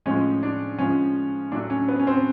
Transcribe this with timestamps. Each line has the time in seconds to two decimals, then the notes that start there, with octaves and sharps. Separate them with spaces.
0.06 A2 F3 G#3 C#4
0.43 D4
0.78 G#2 F3 G#3 C#4
1.52 A2 F#3 A3 D4
1.70 C#4
1.89 B3
2.00 C#4
2.07 C4